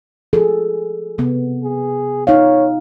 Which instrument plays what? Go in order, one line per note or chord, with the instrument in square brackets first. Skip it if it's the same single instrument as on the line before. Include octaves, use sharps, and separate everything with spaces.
[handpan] F3 G#4 A4
C3 B3
[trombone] G#4
[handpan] D#4 F5 [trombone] C#5